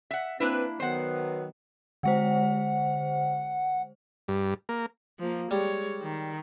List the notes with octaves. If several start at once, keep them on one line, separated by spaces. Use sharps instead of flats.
E5 F#5
A#3 C4 D4 E4 B4
D#3 F#3 B3 C5 F#5
D3 G#3 C5 F#5
G2
A#3
F3 A#3
G3 G#3 C#5
D#3